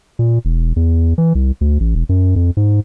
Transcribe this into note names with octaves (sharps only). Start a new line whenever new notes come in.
A#2
E1
E2
E3
C2
D2
A1
E1
F#2
F2
G#2